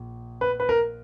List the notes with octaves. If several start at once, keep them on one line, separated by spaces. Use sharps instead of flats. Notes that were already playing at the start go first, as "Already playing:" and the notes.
Already playing: A#1
B4
B4
A#4